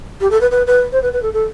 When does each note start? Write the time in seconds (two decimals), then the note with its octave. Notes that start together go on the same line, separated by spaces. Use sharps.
0.20 G4
0.30 A4
0.41 B4
0.51 B4
0.67 B4
0.92 C5
1.02 B4
1.13 B4
1.22 A4
1.33 A4